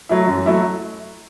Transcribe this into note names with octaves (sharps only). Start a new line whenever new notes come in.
F#3 A3 E4
F#2
F#3 A3 E4